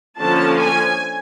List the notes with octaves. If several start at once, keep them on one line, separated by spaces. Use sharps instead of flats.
D3 F3 A#3 C#4 A5
G#5